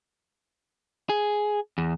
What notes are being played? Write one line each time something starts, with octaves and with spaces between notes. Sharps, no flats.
G#4
E2